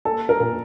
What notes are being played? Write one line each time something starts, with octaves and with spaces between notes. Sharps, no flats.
A#3 A4
A#4
A#2